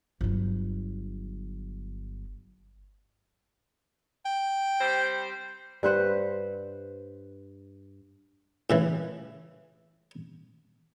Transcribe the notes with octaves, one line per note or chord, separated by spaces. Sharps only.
G1 F#3
G5
G3 C4 C5
G2 B4 C5 F#5
A2 C#3 E3